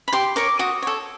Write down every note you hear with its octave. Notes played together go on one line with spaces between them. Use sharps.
B5
G4 C6
A#4 C#5 D6
F#4 D#6
A4 C#5